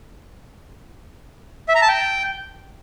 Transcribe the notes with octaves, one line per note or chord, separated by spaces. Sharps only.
E5
A#5
A5
G5